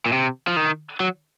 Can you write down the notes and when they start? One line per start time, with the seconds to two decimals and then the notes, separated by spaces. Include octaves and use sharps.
0.06 A#2
0.13 C3
0.47 F3
0.56 D#3
1.00 F#3